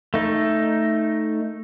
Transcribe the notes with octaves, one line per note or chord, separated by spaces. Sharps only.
A3 D#4